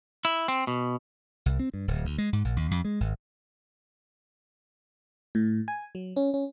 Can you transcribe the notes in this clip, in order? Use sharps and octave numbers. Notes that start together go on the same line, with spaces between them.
E4
C4
B2
C2
C4
G2
D1
D2
G#3
G#2
A#1
D#2
F2
G#3
G#1
A2
G#5
F#3
C#4
C#4